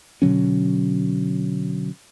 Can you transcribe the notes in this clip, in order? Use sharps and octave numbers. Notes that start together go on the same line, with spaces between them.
B2 D3 F#3 C#4